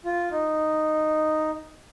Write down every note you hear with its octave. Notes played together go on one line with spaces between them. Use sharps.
F4
D#4